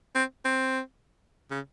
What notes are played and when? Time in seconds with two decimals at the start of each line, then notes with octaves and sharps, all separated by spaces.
0.15 C4
0.45 C4
1.51 C#3